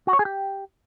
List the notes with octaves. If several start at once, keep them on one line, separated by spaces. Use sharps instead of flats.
F#4
C#5
G#4
G4